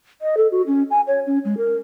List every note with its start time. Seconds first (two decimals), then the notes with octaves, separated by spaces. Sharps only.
0.21 D#5
0.37 A4
0.51 F#4
0.66 C#4
0.90 G#5
1.07 C#5
1.26 C#4
1.44 G#3
1.57 A#4